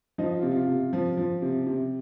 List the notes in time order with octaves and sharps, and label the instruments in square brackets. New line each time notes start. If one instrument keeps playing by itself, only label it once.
[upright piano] F3 D#4
F4
C3
F4
C3
F3
F3
C3
C3